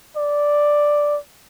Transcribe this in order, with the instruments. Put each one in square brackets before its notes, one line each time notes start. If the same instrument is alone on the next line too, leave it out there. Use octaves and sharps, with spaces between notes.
[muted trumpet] D5